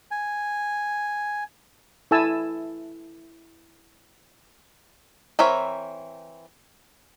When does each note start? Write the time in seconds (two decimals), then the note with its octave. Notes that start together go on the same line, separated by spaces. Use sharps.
0.11 G#5
2.11 E4 A4 G#5 A5 E6
5.39 E3 C4 A#4 C#5 E5